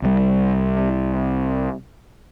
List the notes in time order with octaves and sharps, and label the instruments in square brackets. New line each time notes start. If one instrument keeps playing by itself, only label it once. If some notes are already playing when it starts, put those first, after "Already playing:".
[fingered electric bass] C2 G3